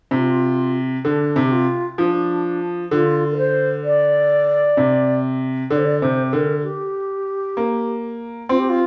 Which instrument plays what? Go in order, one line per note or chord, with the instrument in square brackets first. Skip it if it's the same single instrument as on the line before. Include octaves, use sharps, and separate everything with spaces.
[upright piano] C3 [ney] F4
[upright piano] D3 [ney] D4
[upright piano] C3
[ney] G4
F4
[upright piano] F3 [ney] D4
[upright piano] D3 [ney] F4
[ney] A#4
C5
D5
[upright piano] C3
[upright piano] D3 [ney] D5
[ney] C5
D5
[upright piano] C3 [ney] C5
[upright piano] D3 [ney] A#4
[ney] G4
[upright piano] A#3
[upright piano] C4 [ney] F4
[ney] G4
F4